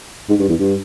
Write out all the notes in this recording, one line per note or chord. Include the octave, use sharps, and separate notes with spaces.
G#2
G2
E2
G2